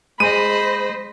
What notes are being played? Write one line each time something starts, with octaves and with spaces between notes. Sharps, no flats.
G#3 C5 D#5 B5 D#7